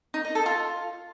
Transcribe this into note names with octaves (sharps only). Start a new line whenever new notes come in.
D#4
D#5
A4
F4